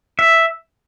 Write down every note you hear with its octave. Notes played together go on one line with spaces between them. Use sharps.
E5